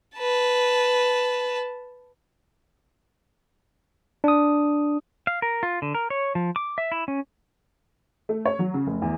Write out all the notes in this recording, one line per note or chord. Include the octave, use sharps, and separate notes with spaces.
B4 A5
D4 D#6
F5
A#4
F4
D3
A#4
C#5
F3
D6
E5
E4
C#4
A3
C#5
F#3
C#3
F1
E2